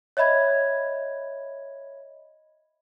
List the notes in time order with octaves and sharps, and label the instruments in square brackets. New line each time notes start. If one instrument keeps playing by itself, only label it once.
[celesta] C#5 D#5 E5 B5 G#6